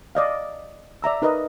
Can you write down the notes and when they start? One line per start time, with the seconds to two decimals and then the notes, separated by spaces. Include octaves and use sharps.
0.15 D5 D#5 F5
1.02 D5 E5 A#5 E6
1.22 D#4 A#4 B4 D#5